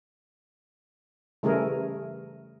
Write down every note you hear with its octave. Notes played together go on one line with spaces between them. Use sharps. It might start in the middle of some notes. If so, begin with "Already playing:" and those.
C#3 E3 G3 A3 G#4 A#4